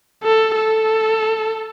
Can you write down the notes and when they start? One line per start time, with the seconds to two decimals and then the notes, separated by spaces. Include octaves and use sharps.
0.24 A4
0.55 A4